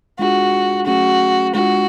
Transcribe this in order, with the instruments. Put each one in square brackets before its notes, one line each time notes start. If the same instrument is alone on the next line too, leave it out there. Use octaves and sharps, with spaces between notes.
[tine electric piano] G#3 D4 F4 G#4 [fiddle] F#4
[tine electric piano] F#3 A3 C#4 G#4 [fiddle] F#4
[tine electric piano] G#3 D4 F4 [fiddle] F#4